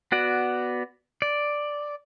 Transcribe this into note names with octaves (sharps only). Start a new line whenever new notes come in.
B3 F#4 D5
D5